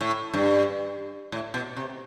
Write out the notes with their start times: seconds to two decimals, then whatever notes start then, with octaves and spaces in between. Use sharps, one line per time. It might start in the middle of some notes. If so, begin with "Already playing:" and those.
0.01 A2
0.34 G2
1.32 A2
1.54 B2
1.77 C3